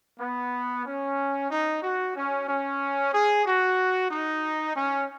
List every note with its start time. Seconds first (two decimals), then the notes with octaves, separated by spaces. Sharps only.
0.20 B3
0.86 C#4
1.51 D#4
1.83 F#4
2.16 C#4
2.48 C#4
3.13 G#4
3.46 F#4
4.11 D#4
4.76 C#4